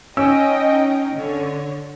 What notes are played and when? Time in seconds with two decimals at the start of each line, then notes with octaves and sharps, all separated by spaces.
0.17 C#4 D#4 D#5 G5 E6
1.14 D3 C#5